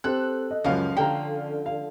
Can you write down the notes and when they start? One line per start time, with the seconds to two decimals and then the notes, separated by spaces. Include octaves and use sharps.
0.04 C4 G4 A4 C5 F#6
0.51 D#5
0.64 C#2 F#2 F3 C#4 F5
0.97 D3 G5 A#5
1.66 F5